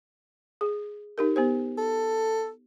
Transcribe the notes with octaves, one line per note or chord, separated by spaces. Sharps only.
G#4
D#4 G4 A#4
B3 G4 C5
A4